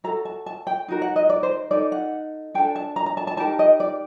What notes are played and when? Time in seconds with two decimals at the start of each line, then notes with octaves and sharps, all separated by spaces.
0.04 F#4 A4 A#5
0.25 A5
0.46 A5
0.67 G5
0.88 D#4 F#4 A#4
1.02 F#5
1.16 D#5
1.30 D5
1.43 C5
1.71 D#4 A4 D5
1.92 F#5
2.54 D4 G5
2.58 A4
2.76 A5
2.96 A#5
3.06 A#5
3.17 A5
3.27 A5
3.37 D#4 G4 A#4 A5
3.59 D#5
3.80 D5